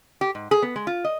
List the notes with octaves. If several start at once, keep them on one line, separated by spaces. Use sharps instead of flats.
G4
G#2
G#4
B3
G#3
F4
D#5